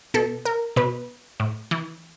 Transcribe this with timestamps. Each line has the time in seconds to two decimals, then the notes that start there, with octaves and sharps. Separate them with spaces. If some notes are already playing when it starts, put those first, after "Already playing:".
0.14 B2 A4
0.45 A#4
0.76 B2 B4
1.40 A2
1.71 E3